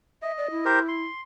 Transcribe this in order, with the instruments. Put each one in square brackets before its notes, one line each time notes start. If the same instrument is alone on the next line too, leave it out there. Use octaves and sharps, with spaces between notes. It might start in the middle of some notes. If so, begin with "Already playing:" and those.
[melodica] D#5 [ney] E5
[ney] D5
E4
[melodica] G4 A#4 C5
C6